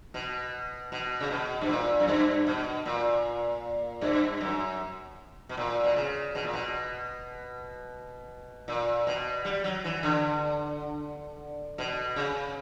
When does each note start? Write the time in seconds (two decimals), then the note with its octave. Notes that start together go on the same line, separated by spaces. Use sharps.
0.14 B2
0.92 B2
1.21 C#3
1.31 B2
1.61 G2
1.69 A#2
2.00 F#2
2.08 G2
2.47 B2
2.86 A#2
4.01 G2
4.41 F#2
5.49 B2
5.57 A#2
5.84 B2
5.96 C#3
6.35 B2
6.44 A#2
6.54 B2
8.68 A#2
9.07 B2
9.45 G3
9.64 F#3
9.84 E3
10.03 D3
11.78 B2
12.16 C#3